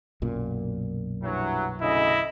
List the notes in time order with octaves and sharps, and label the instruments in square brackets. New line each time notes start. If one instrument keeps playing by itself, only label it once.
[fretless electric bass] B1 F#2 A#2
[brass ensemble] G2 E3 F#3
[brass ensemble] D2 C#3 D#5 [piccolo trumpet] E4